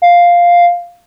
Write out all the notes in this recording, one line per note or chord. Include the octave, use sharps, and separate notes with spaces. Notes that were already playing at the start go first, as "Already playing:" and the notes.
F5